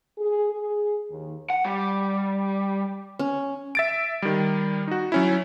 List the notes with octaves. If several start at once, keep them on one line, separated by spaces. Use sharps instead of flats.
G#4
G#4
D#2
F#5
G3
C#4
E5 A6 D7
D#3 G3
D#4 F#4
F#3 C#4 E4